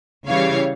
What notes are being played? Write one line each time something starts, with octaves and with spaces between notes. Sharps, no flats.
C#3 E3 G3 C#5 F5